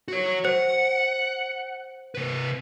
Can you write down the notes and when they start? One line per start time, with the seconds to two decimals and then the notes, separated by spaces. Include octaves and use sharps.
0.08 F#4 C#5
0.45 C5 F#5
2.15 C3 B4